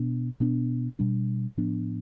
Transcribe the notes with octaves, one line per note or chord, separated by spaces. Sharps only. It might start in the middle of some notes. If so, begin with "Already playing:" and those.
Already playing: B2 B3 D4
B2 B3 D4
B2 G3 D4
A2 F3 B3 D4